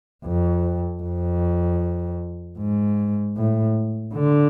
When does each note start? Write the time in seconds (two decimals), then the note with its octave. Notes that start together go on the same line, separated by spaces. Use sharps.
0.25 F2
1.03 F2
2.59 G#2
3.37 A2
4.14 D3